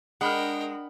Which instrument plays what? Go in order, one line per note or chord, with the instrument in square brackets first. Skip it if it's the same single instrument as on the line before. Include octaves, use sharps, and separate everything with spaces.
[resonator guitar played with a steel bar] G#3 [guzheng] D4 [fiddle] A#4 G5 [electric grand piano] F#5 B5 F6